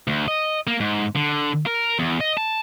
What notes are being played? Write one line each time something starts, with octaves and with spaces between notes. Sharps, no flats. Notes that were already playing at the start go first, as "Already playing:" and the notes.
D2
D#5
A#3
G#2
D3
A#4
E2
D#5
A5